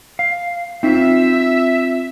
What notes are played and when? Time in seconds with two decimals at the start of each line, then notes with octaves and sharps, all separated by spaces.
0.19 F5
0.83 C4 D#4 F4 E5